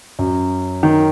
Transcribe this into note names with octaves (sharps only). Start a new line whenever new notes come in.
F#2
D#3